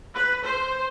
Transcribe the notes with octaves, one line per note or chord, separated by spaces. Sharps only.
B4
C5